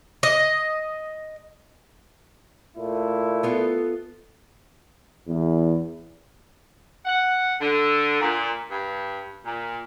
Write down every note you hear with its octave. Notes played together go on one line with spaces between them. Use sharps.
D#5
A#2 A3 E4
B3 F4 A4
E2
F#5
D3
A#2
G2
A#2